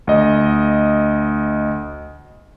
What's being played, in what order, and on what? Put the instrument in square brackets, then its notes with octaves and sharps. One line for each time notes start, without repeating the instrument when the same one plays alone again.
[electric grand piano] D2 D#5